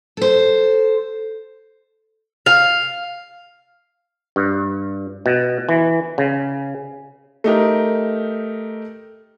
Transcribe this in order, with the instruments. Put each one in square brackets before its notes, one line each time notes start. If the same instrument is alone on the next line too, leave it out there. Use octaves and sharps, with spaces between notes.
[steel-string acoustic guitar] A4 C5
[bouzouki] F5
[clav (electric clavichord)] G2
B2
E3
C#3
[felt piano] A3 D#4 G4 A#4